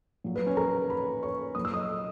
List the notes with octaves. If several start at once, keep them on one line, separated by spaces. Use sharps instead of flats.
A#2 F#3
B4
C#4 C#5
A#4 A#5
B4 B5
C#5 C#6
A#2 F#3 D#6
E6
D#5 D#6